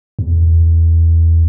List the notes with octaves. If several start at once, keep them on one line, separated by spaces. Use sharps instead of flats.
E2